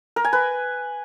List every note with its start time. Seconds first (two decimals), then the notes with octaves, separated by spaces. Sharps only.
0.16 A#4
0.24 G#5
0.33 B4